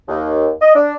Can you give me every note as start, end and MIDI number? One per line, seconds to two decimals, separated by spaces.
0.08 0.49 39
0.61 0.73 75
0.75 0.95 62